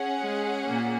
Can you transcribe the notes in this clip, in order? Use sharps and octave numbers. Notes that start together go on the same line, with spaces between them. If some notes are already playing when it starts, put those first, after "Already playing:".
Already playing: C#4 G#4 F#5
G#3
A#2 A#3